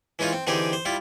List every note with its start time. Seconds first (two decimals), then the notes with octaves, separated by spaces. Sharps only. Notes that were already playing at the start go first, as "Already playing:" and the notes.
0.19 E3 G#3 C#4 D#4 F4
0.33 C4
0.47 D3 E3 C4 D#4 G4 G#4
0.73 C5
0.85 G3 E4 F4